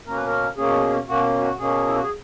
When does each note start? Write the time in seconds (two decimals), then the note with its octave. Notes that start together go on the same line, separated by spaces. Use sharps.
0.07 B2 A#3 C#4 A#4
0.16 B4
0.27 A#4
0.57 B2 A#3 C#4 G#4
1.08 B2 A#3 C#4 F#4
1.41 F#4
1.59 B2 A#3 C#4 G#4
1.87 E4
1.95 F#4
2.02 G#4